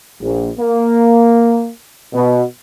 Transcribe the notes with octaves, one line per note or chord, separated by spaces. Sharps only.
A#1
A#3
B2